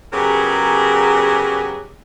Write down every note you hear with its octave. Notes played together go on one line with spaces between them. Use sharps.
C#3 F#3 B3 G4 G#4 A#4